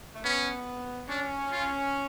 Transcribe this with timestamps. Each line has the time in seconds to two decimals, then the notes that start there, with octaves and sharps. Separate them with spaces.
0.15 A3
0.24 B3 C#4
1.08 C#4 D4
1.51 F4